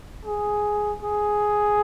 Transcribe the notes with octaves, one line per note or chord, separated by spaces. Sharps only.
G#4
G#4